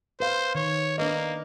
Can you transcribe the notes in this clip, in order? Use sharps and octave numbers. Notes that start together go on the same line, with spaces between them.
B4 C5 F5
D#3 C#5
A#3 D4 B4 D#5